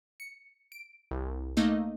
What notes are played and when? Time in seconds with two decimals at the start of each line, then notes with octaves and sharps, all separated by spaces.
0.20 C#7
0.72 D7
1.11 C2
1.57 A3 A#3 D#4 D#5 F5